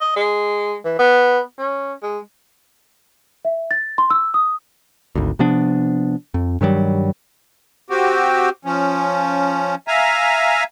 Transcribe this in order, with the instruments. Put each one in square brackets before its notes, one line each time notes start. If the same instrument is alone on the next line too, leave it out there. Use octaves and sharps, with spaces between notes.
[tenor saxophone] D#5
G#3
E3
B3
C#4
G#3
[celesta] E5
A6
C6
E6
D#6
[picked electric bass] G#1 D2
C3 F3 B3 D4
F2
G2 D#3 F#3 G3
[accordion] C4 F#4 G4
F3 C#4
E5 F5 G#5 A#5